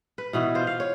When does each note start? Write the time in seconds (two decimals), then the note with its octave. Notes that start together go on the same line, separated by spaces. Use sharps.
0.18 B4
0.33 B2 E3 B3 F#4
0.55 F4 C5
0.67 F5
0.80 C#5